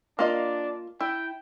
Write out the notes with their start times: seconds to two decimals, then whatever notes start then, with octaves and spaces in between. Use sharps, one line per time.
0.19 A#3 D4 F4 D#5
1.00 E4 G5